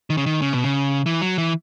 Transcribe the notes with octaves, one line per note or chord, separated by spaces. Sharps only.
D#3
C#3
D#3
C#3
B2
C#3
E3
F#3
E3